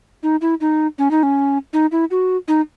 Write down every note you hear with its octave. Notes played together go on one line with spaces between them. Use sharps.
D#4
E4
D#4
C#4
D#4
C#4
D#4
E4
F#4
D#4